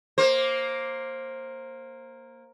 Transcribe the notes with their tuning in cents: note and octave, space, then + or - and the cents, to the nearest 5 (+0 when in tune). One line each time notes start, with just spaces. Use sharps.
A#3 +0 C5 +20